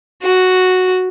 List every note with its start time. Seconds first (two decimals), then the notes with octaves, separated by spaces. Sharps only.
0.23 F#4